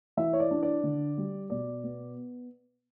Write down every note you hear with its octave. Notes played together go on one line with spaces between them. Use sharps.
E3 E5
C#5
D5
D4
D5
D3
G3
B2 D5
B3